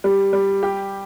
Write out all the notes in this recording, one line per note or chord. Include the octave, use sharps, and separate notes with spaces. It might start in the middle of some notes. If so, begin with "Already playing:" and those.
G3
G3
G4